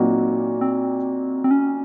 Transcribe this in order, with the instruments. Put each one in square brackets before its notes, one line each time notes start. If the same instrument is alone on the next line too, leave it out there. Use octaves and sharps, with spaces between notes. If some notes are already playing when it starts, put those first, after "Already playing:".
Already playing: [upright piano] A#2 F#3 A#3 D#4 F#4 [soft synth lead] C4
[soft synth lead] C4
C4
C#4